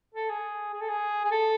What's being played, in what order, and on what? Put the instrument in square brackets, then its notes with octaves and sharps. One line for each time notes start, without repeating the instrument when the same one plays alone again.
[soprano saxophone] A4
G#4
G#4
A4
G#4
G#4
A4